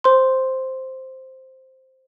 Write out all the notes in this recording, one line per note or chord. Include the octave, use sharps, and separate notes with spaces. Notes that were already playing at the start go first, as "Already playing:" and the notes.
C5 C6